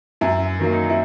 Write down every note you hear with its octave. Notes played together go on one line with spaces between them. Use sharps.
F#2 E4
D#3 F#3 A#3
D#4
E4